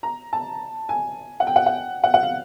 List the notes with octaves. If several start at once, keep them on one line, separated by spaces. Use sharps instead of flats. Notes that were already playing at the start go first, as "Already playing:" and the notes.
A#5
A5
G#5
F#5
G5
F#5
F#5
F#5
F#5
F5